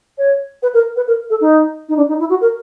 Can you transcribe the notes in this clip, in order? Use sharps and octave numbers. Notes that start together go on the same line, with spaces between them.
C#5
B4
A#4
B4
A#4
A4
D#4
D#4
D4
D#4
E4
F#4
A#4